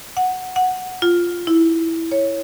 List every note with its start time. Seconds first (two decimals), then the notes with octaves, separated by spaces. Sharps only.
0.17 F#5
0.56 F#5
1.02 F4
1.47 E4
2.12 C#5